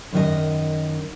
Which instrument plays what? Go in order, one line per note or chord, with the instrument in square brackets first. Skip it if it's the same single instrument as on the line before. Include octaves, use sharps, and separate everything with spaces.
[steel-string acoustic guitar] F#2 D#3 D#5